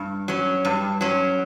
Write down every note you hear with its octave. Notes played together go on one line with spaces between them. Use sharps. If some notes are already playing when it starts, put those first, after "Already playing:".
Already playing: G2
F#3 C#4
G2
F#3 C#4